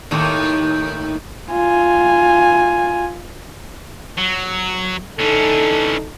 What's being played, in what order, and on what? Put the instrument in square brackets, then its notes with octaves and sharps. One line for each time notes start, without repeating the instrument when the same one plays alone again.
[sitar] D#2 A2 D#3
[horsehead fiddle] F4 G#5
[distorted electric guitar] F#3
[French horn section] D3 D#4 A4 [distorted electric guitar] E3 C#4